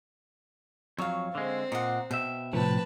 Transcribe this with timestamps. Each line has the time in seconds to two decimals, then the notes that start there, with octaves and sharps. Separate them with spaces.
0.98 F2 F#3 C#5 F5
1.35 D3 G#3 C4
1.72 A#2 D#5 F#5
2.11 B2 E5 G5
2.53 A2 C3 F3 B4 A5